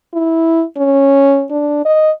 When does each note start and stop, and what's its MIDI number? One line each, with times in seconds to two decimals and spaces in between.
0.14 0.64 64
0.77 1.46 61
1.51 1.84 62
1.85 2.11 75